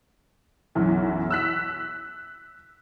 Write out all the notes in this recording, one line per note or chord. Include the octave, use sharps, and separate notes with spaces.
B1 F#2 E3
E6 F#6 B6